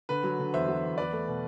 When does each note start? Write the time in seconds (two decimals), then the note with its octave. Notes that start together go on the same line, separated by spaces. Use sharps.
0.09 D3 B4
0.24 F#3
0.39 D3
0.54 E2 C5 E5
0.68 F#3
0.83 E2
0.98 E2 B4 D5
1.13 A3
1.28 B2